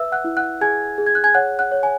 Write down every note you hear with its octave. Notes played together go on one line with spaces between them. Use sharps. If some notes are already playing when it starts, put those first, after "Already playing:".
Already playing: B4 E5 E6
F#5 F#6
E4
F#5 F#6
G#4 G#5 G#6
G#4
G#6
F#6
G#5 G#6
C#5 F#5 F#6
F#5 F#6
C#5
G#5